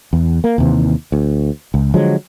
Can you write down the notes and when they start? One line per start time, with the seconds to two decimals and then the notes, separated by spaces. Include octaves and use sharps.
0.13 E2
0.44 A#3
0.58 D#2 C3 E3
1.12 D2
1.74 C#2
1.94 D3 F3 F#3 G#3